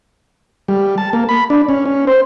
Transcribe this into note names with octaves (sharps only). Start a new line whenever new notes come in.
G3
A5
A#3
B5
D4
C#4
C#4
C5